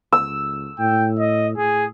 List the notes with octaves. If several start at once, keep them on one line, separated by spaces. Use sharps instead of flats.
C#2 E6
A2 G5
D#5
A2 G#4